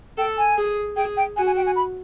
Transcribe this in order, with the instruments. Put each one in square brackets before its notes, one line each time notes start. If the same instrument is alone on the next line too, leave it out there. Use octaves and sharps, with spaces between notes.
[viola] A4 [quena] G5
[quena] G#5
[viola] G#4
[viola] G#4 [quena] G5
[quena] G5
[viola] F#4 [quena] G#5
[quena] G#5
G5
G#5
B5